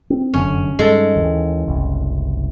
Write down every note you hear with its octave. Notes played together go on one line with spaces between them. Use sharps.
C4
F1 F#2 D3 C#4
G2 D#3 G#3 A4
D#2 E3
F#1 C2